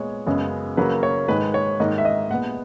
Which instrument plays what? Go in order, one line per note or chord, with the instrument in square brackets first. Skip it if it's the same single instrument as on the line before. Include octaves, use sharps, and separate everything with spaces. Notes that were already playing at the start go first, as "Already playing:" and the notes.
Already playing: [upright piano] A#2 G#3 B3 C#5
F#2 C#3 G#3 B3
C#3 F#3 A#3 B4
C#5
G#2 D#3 G#3 B4
C#5
G#2 D#3 A#3 D#5
E5
D#5
A#2 G#3 B3 F#5